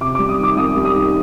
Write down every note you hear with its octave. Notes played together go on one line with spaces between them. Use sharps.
C3 D6
G3 D6
D#6
D#3 D6
C2 D#6
G3
D#6
D#3